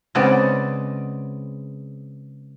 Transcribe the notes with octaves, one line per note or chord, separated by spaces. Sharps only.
C#3 G#3 B3 C4 D5